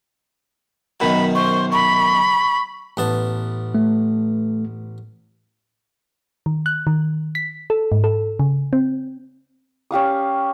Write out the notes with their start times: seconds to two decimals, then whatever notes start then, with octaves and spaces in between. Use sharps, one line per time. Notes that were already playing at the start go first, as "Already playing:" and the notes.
1.00 F#2 B2 D#3 B5
1.35 C5 C#6
1.72 B5 C#6
2.97 A1 B3 A5
3.75 A3
6.46 D#3
6.66 F#6
6.87 D#3
7.35 B6
7.70 A4
7.92 G#2
8.04 A4
8.40 C#3
8.73 C4
9.91 C#4 G4 F5 D#6